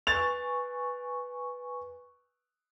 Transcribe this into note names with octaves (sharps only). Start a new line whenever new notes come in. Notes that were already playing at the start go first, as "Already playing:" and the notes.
B4 G#5 C#6 A6 F7